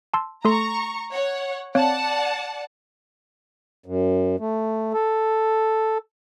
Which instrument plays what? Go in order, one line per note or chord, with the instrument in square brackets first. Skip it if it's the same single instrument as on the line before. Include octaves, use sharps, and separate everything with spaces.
[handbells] A5 C6 E6
[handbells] A3 A4 C6 [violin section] A#5 C#6
[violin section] C#5 F#5
[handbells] C4 C#5 F5 [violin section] D5 F#5 A5
[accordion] F#2
A3
A4